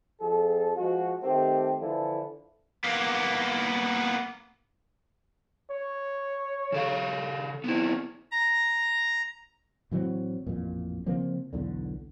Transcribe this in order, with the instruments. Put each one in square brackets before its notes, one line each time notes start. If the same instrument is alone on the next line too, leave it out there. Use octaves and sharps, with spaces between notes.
[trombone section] F2 F3 G#4 A4
F3 G#3 F#4
D#3 A3 C4 G4
D3 E3 F3 E4 A4
[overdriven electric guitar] A#3 B3
[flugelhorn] C#5
[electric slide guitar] C#3 A4 F5
B3 C4 E4
[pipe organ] A#5
[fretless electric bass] A2 E3 F#3 C4
A1 F2 A#2
C#3 F3 A#3 C4
B1 E2 D3